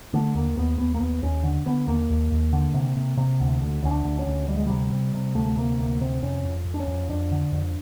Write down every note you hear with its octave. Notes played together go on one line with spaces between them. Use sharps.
D3 A3
D#2 A#3
D#2 B3
D#2 B3
A#3
D#2 B3
D#2 C#4
D3
D3 B3
D#2 A#3
D#2
D#2
D3
C3
C3
C3
D2
D2
D2 C#4
D4
D2
C#4
D2
D2 G3
G#3
C3 G3
C3
C3
D2 A3
A3
C3 A#3
D2 A#3
C3 C4
F2 C#4
F2
F2
D4
C#4
F2
F2 D4
D3
F2